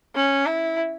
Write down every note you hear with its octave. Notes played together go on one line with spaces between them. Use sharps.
C#4
E4